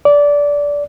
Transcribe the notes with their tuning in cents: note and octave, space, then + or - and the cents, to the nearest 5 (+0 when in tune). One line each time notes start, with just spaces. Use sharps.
D5 -15